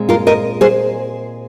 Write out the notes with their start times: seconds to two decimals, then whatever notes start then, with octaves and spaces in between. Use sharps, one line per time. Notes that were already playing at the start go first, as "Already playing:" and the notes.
Already playing: A#2 G#3 C4
0.09 F4 A#4
0.27 A#4 D#5
0.61 G#4 C5